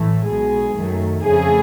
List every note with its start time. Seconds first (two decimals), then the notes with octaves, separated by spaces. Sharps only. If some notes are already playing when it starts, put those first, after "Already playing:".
Already playing: A1 A2 E3 A3
0.27 B1 B2 G#3 G#4
0.76 F#2 D#3 F#3 A3
1.23 F2 C#3 F3 A3 G#4